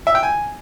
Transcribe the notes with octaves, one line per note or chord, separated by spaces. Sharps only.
E5
G5
G#5